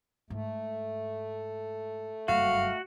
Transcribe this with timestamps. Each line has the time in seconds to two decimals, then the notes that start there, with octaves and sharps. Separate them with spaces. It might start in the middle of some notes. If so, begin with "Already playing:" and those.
0.30 G#2 A3
2.28 F#1 G2 F#4 F5